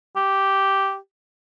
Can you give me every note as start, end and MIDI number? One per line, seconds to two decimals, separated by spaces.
0.16 0.97 67